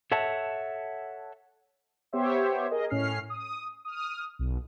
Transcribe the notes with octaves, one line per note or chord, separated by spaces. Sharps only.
A4 C#5 E5 F#5 A5
B3 G4 C5 C#5 E5
G#4 A#4 D#5
A2 C#4 F6 C7
D#6
D#6 F6
B1